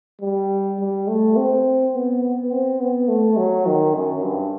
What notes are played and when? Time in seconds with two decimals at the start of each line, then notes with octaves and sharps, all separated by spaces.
0.21 G3
0.79 G3
1.07 A3
1.37 C4
1.94 B3
2.23 B3
2.51 C4
2.79 B3
3.08 A3
3.37 F#3
3.66 D#3
3.94 F#2
4.23 G2